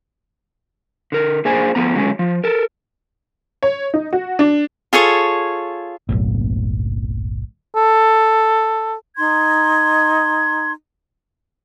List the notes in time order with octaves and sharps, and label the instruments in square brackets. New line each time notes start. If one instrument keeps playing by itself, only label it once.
[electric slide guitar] D3 A#4
A#3 D4 G#4 C5 D5 G#5
F3 A3 B3 A#5
D3 F#3 G#3 C#4
F3
A4 A#4
[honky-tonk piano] C#5
D#4
F#4
D4
[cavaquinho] F4 G#4 A4 C#5
[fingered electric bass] F#1 B1 A2
[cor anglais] A4
[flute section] D#4 C6 G#6